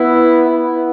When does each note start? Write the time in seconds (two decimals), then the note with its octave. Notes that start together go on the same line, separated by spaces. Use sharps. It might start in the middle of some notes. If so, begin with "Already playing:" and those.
Already playing: B3 E4
0.48 B3 E4